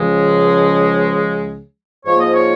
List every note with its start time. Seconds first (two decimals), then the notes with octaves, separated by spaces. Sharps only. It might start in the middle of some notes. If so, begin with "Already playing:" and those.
Already playing: C#2 C#3 F3 G#3
2.06 G#2 F3 A#3 C#5
2.20 D#5
2.34 C#5